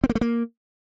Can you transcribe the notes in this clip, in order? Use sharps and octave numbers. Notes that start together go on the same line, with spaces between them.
C4
A#3
A3
A#3